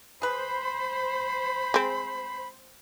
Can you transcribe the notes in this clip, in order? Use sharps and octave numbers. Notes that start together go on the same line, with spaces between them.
G#4 B4 C5 B5
G#3 C4